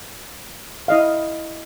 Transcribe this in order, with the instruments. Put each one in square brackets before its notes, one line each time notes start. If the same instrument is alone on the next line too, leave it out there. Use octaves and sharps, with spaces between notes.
[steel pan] E4 D#5 F5